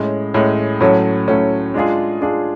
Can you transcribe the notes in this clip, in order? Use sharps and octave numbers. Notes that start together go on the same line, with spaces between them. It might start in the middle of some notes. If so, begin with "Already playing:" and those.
Already playing: A2 G#3 C#4
A2 G#3 C#4
A2 F#3 A3 C#4
A2 F#3 A3 C#4
G#3 D4 F4 G#4
G#3 D4 F4 G#4